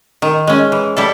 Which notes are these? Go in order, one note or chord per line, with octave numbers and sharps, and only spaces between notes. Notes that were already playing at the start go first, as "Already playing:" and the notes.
D#3
G#3 C#4
E3
G3 E4 A4